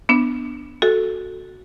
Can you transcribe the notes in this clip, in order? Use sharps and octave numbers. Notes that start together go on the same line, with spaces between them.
B3 D4
F#4 A4